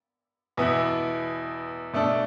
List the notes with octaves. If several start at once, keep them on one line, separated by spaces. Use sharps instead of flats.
E2 B2 B3 E4
B2 A3 D4 A4